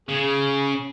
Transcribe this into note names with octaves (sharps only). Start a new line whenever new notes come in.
C#3 G#4